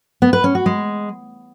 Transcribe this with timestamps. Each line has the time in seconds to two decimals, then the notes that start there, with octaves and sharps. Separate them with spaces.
0.22 B3
0.33 B4
0.44 C#4
0.55 F#4
0.66 G#3